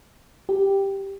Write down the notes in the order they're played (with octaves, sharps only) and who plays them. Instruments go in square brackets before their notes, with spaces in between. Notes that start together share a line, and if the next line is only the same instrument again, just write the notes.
[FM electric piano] G4